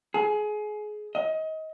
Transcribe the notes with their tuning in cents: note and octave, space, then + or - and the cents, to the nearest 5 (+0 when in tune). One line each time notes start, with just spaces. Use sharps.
G#4 +25
D#5 +25